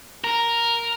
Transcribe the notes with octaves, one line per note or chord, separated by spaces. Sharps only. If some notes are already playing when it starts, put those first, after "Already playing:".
A#4